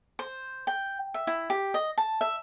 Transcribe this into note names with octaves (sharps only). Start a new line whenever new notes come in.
C5
G5
E5
E4
G4
D#5
A5
E5